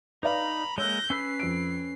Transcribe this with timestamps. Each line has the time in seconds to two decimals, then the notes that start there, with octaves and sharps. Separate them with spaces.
0.23 D#4 B4 D5 F5 A#5 B5
0.78 G#3 A#3 C#5 E6 F#6 G6 A#6
1.10 C#4 B4 B5 E6 C7
1.40 F2 D7